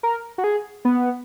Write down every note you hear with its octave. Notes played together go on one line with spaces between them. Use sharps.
A#4
F#4
G#4
B3